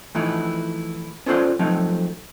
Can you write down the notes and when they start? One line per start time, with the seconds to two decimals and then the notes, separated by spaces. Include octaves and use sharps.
0.15 E3 F3 A3 D#4 E4
1.26 C#4 F4 A4 C5 D5 C6
1.59 F3 F#3 A3 C4 D#4